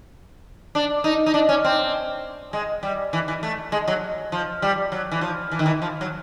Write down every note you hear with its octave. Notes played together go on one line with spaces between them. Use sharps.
D4
D#4
D#4
D4
C#4
C4
G#3
G3
E3
E3
A3
G#3
F#3
F3
G3
F#3
E3
F3
E3
D#3
E3
F3
F#3